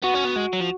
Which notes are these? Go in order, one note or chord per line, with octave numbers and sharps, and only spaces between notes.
B3 F#4
C#4
B3
G#3
F#3
F3